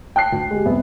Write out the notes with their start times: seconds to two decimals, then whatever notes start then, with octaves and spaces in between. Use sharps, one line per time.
0.16 G5 A5 F#6 C7
0.32 D2
0.51 G#3 G4
0.65 C2 F2 B3 E5